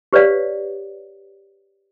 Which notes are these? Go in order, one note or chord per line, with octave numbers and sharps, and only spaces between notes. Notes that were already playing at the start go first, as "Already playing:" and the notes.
G4 B4 C#5 D5 F5